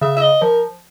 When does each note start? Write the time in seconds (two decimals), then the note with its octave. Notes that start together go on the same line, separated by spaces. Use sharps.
0.01 C#3 E5
0.16 E5
0.21 D#5
0.42 F3 A#4